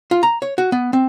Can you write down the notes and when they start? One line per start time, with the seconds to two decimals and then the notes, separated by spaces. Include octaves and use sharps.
0.11 F4
0.23 A#5
0.42 C#5
0.58 F#4
0.72 B3
0.93 C4